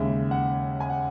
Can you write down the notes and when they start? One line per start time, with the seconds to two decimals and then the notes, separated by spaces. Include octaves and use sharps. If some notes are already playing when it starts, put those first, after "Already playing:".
Already playing: D#2 C#3 G#3 E5
0.31 F#5
0.80 G#5
0.90 F#5